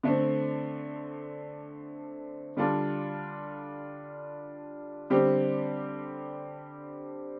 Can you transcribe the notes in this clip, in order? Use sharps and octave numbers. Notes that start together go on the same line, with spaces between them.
D3 A3 C4
D3 G3 D4 F4 A4
D3 G3 C4 G4